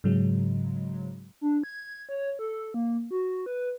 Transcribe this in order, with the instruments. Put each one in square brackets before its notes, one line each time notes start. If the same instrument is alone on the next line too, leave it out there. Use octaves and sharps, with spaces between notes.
[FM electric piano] G#2 C#3 F#3 G#3
[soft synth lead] D4
G#6
C#5
A4
A#3
F#4
B4